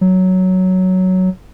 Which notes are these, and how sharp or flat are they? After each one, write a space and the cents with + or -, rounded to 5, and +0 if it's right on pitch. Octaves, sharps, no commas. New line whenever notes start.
F#3 +5